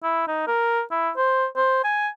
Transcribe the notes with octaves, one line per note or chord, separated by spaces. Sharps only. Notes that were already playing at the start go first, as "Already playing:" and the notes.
E4
D#4
A#4
E4
C5
C5
G#5